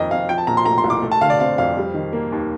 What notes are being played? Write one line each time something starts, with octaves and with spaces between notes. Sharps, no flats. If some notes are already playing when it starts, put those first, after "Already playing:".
Already playing: F2 D#3 A#3 A#4 D#5
F2 F5
F3 G5
A5
A#2 A#5
C6
A3 A#5
C6
C2
D6
A3
A5
D3 F5
D5
C4 F5
F2 F5
G3
D#3
A#3
D#2